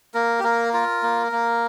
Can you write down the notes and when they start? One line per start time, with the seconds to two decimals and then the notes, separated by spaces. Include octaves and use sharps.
0.14 A#3 A#4
0.39 G4
0.44 A#3 A#4
0.73 F4 A#4
1.03 A#3
1.32 A#3